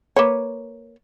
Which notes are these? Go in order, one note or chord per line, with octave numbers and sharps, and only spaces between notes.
A#3 B4 C#5